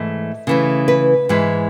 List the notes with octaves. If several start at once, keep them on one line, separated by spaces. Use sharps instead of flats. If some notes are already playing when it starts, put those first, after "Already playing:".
Already playing: G#2 E3 A3 D#5
C#3 E3 A3
B4
G#2 E3 G#3